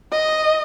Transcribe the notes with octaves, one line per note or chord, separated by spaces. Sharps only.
D#5